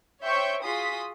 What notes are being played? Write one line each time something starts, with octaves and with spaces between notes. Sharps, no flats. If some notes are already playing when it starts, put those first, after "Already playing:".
C5 C#5 E5 G5 C#6 G6
F4 F#4 G#4 C6 D#6 B6